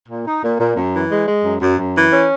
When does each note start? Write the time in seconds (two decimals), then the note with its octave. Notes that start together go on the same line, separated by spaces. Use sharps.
0.09 A#2
0.26 D#4
0.43 A#2
0.60 A#2
0.77 F#2
0.94 E3
1.11 G#3
1.27 G#3
1.45 F#2
1.61 F#2
1.79 F#2
1.96 E3
2.13 C#4